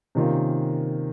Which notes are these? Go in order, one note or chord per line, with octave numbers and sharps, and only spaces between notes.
C3 D#3 A#3 C#4 F4